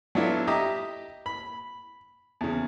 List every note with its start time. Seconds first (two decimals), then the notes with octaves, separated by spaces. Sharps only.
0.15 F#3 B3 D4 E4 F4 A4
0.47 G4 D#5 E5 A#5 D6 D#6
1.26 B5
2.41 E2 C#3